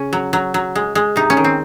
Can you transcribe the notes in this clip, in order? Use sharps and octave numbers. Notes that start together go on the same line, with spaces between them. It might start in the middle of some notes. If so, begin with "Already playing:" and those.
Already playing: C#3 C#4
F#3
F#3
F#3
G#3
G#3
C3 D#4
C#4
D#3
C4